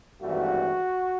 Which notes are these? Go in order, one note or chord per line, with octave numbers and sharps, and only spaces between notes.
G#1 G2 E3 A3 F#4